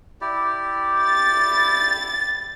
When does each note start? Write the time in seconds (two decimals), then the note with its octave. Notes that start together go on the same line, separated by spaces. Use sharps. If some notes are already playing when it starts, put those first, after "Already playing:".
0.21 E4 G4 D5
1.02 A6